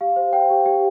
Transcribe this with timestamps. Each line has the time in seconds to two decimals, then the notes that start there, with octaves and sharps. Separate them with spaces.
0.01 G4 F5
0.16 C5
0.33 C5 G5
0.50 G4
0.66 G4